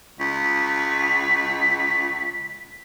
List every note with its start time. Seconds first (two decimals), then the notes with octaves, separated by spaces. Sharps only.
0.19 C#2 B6